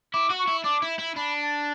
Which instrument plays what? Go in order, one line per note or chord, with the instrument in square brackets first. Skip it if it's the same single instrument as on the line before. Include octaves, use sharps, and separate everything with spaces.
[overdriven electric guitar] E4 [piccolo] D6
[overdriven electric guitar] F#4
[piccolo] C#6
[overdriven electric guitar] E4
[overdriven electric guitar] D4 [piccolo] D6
[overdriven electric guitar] E4
E4
[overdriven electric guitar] D4 [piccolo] B5
[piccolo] A5